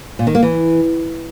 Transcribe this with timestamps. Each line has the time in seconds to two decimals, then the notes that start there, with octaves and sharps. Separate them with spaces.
0.19 A#2
0.27 D#3
0.35 A#3
0.42 E3